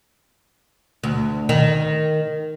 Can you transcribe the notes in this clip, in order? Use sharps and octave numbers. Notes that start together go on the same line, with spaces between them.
D2
D#3